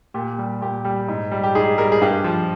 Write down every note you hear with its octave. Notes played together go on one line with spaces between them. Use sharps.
A#2 G4
G3
A#2 G4
G3 G4
G#2
G3
G4
G#2 G#4
G3 A#4
G#4
G2 G4
F3